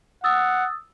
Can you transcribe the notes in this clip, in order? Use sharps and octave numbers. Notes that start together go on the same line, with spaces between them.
F#5 D#6 E6 A6